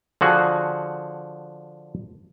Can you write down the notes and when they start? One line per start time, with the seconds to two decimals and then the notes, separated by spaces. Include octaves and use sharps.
0.21 D3 F3 F#4 G#4